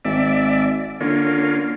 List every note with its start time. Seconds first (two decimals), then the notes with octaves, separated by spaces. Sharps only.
0.05 G#1 D5 E5
1.00 D3 A#3 C#4 F4